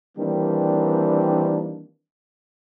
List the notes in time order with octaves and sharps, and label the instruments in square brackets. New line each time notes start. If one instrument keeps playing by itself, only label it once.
[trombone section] D#3 E3 G3 A#3 C4 D4